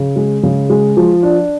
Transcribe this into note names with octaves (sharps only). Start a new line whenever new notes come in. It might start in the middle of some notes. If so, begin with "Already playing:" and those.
Already playing: C#3
G#3
C#3
G#3
F3
D4